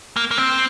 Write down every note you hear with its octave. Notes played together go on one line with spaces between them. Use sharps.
A#3
A#3
C4